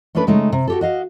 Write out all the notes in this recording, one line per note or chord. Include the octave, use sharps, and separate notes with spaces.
A3 C#4 D4 A4 B4
C#3 G#3 A3 C#4 D#4
C3
F#4 G4 A4
F#4 D#5 F5